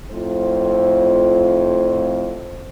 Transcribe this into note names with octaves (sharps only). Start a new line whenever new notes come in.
F2 A2 F4 C5